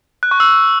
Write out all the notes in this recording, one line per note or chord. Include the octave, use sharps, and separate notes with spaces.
F#6
C#6
E6